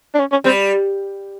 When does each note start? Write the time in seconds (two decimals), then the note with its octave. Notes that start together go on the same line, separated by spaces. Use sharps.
0.14 D4
0.20 C#4
0.31 C#4
0.44 G3 C4